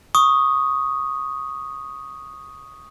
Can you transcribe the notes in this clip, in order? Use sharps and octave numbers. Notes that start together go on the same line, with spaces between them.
C#6 D#6